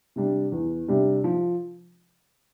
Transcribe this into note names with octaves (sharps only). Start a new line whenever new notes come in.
C3 G3 D4
E2
C3 G3 D4
F3